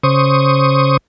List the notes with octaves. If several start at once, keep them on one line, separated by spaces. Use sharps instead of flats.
C#3 C5 C#6 D#6